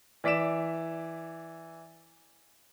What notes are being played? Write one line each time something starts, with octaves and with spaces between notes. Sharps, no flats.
E3 D5 B6 D7 E7